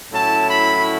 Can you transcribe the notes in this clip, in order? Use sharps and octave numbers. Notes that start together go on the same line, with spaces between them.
A2 F#3 C#4 E4 A5
B5